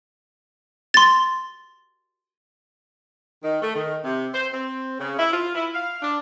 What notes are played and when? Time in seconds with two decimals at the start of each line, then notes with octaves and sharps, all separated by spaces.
0.94 C6 A6
3.43 D#3
3.62 A3
3.76 D#3
4.04 C3
4.34 C5
4.53 C4
5.00 C#3
5.19 E4
5.33 F4
5.55 E4
5.74 F5
6.02 D4